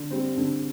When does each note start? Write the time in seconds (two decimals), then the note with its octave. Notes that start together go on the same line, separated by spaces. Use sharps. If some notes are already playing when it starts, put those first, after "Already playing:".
Already playing: D3
0.10 G3 C4
0.37 D3